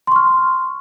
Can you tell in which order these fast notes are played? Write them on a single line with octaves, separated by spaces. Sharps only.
C6 C#6 F6